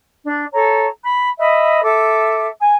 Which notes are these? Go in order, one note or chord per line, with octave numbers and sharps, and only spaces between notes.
D4
A4 C#5 A#5
B5
D#5 E5 B5
A4 E5 D6
G#5